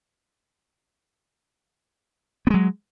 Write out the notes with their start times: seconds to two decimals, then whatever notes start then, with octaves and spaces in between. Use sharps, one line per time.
2.47 B3
2.50 G#3
2.54 F#3